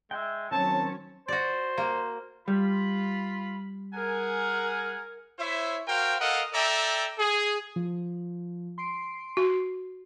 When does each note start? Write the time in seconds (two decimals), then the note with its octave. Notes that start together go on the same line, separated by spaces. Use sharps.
0.11 G#3 E5 G5
0.51 D#3 F#3 C4 C#4 C#5 G#5 A5
1.28 F#4 C5 D5
1.78 A#3
2.48 G3 F4 B5
3.94 G#4 A#4 F#5 G#5
5.39 E4 C5 C#5 E5
5.88 F#4 A#4 C5 F5 G5
6.20 A4 A#4 D#5 F5 F#5
6.54 A4 D5 E5 G5 A#5
7.19 G#4
7.76 F3
8.78 C6 C7 D7
9.37 F#4